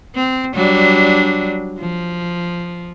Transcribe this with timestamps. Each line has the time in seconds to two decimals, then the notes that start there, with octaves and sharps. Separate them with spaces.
0.15 C4
0.55 F#3 G3 D4
1.80 F3